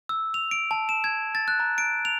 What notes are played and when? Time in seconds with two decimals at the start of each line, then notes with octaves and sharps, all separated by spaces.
0.09 E6
0.34 F7
0.51 D7
0.71 A5
0.89 E7
1.04 G#6
1.35 A6
1.48 F#6
1.60 A#5
1.78 D7
2.05 F7